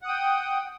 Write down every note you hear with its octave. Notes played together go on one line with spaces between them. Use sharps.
F#5 G5 D#6